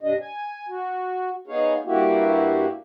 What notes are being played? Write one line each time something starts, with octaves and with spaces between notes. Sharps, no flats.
G2 C3 D4 D#5
G#5
F#4
B3 D#4 G#4 C#5 F5
G2 A#3 E4 F#4 G4